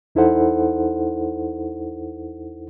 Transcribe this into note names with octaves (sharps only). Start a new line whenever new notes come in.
E2 D#4 E4 A4 C5 F#5